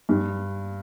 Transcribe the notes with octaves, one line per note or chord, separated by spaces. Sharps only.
G2